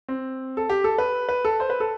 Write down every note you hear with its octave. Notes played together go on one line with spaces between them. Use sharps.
C4
A4
G4
A4
B4
B4
A4
C5
B4
A4